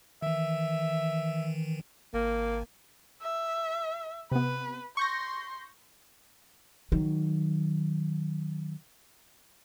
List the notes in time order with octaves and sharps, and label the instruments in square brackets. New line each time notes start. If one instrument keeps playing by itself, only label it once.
[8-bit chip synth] D#3 E3 [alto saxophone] E5
[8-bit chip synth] G#1 [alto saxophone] A#3
[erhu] E5
[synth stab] C3 B3 [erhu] B4
[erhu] C6 [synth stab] C#6 G6 A#6
[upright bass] D#3 F#3